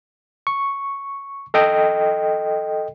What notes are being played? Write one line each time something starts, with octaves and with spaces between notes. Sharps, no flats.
C#6
A4 D#5 G5